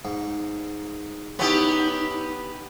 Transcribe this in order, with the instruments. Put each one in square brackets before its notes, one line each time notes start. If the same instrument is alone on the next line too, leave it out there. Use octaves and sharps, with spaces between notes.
[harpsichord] G#2
[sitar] B3 G4 [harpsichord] C#4 E4 D#6 [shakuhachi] D#4